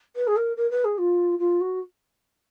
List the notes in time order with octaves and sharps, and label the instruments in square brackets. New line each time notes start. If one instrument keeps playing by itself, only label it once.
[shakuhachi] B4
G#4
A#4
A#4
B4
G#4
F4
F4
F#4